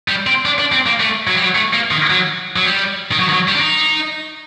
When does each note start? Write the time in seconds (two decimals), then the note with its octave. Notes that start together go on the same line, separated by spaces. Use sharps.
0.08 G3
0.27 C4
0.45 D4
0.59 D4
0.72 C4
0.86 A#3
1.00 A3
1.27 F#3
1.35 G3
1.42 F#3
1.55 A3
1.73 A#3
1.91 D#3
2.10 F#3
2.56 F#3
2.65 G3
3.11 D#3
3.20 F#3
3.29 D#3
3.33 F#3
3.48 G3
3.55 D4
3.61 D#4